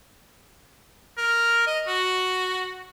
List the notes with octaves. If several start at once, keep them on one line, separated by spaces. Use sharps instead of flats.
A#4
D#5
F#4